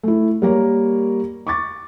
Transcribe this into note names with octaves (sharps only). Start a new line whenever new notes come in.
A3 E4
G3 A#3 A#4 C#5
C#6 D6 A6